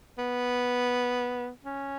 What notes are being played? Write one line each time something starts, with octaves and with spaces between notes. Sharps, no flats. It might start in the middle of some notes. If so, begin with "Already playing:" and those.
B3
C#4